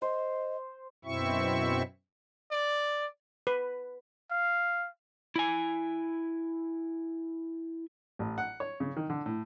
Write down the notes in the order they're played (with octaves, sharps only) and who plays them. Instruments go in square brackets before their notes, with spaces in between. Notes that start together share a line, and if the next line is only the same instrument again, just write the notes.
[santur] C5 [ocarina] D#5
[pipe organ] F#2 B2 C4 E4 E5 C#6
[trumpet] D5
[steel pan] B4
[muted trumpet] F5
[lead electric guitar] E4 G#5
[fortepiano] A1
F#5
C#5
C#3
D#3
D3
A2